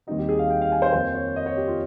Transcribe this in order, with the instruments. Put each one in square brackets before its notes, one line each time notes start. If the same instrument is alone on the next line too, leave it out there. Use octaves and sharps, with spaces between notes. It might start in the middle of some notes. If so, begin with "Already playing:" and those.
[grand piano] D#2 D#3 G3 C4 D#4
G4
G#4
F5
G5
F5
G#5
C5
F2 D#3 A#3 C5
C#5
D#5
C#5
G4
F4